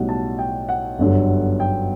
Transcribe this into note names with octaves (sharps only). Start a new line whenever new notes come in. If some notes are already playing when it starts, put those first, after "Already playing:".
Already playing: B1 A2 G3 F#5
A5
G5
F#5
G1 F#2 D3 G3
G5